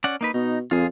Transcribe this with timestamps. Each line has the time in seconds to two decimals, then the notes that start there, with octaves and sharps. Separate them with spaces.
0.04 C#4 D5 F#5
0.21 A#3 D#4 B4
0.34 B2 D#4
0.71 F2 F4 G#4